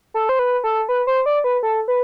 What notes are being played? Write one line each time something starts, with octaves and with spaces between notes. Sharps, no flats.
A4
C5
B4
A4
B4
C5
D5
B4
A4
B4